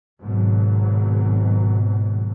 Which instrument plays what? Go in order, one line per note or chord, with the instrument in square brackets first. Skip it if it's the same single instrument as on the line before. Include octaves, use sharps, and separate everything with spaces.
[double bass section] G#1 G#2 B2 F#3